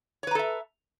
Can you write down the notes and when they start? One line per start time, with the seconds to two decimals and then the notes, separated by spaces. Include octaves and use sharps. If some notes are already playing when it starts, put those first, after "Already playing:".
0.23 C#5
0.27 B4
0.31 A#5
0.35 A4
0.39 E5